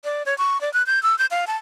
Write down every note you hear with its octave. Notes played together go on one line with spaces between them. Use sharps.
D5
C#5
C#6
D5
F#6
G6
E6
G6
F5
A5